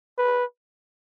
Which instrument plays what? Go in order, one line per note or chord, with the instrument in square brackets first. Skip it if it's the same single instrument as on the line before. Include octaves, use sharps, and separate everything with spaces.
[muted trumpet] B4